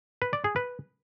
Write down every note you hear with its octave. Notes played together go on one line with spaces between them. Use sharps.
B4
D5
G#4
B4